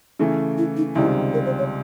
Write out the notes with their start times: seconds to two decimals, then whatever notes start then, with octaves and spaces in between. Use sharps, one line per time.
0.19 C#3 E3 A3
0.58 E4
0.77 D#4
0.95 C#2 C3 D#3 G3 E4
1.34 A#4
1.46 C5
1.58 C#5